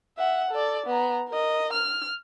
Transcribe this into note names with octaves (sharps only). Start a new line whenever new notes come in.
E5 F#5
A4 D5
B3 A#5
A#4 D#5
F6